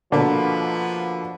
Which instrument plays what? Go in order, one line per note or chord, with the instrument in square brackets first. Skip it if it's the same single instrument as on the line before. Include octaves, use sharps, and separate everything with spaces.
[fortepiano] B2 D3 A#3 [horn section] F3 B4